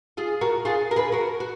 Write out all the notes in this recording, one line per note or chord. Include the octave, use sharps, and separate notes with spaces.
F4 G#4
F#4 A#4
F4 G#4
A#4
G#4 B4
F#4 A#4
F#4